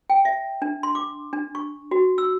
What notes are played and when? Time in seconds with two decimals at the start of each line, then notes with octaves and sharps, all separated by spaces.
0.10 G5
0.25 E5
0.62 D4
0.83 C6
0.95 D6
1.33 D4
1.55 C#6
1.91 F#4
2.18 E6